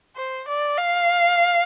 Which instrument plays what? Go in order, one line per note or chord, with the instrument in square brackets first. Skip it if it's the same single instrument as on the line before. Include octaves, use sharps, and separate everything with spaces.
[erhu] C5
D5
F5